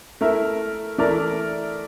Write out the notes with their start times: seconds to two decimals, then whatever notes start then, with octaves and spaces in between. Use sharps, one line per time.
0.21 A3 E4 A#4 E5
0.98 E3 A3 E4 A#4 D5